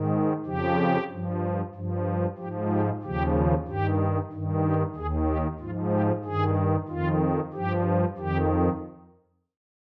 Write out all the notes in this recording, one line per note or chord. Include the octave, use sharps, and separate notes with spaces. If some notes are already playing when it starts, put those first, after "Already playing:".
Already playing: G#2 D#3
F2 C#3 F3 G4
G2 F3
G2 F3
G#2 F3 G4
G4
D#2 C#3 F3 G4
G2 D#3 G4
G2 D#3
G4
D#2 D#3 G#4
G4
G#2 F3 F4
G4
G2 D#3 G#4
F2 D#3 F4
G2 F3 G4
F2 D#3 G4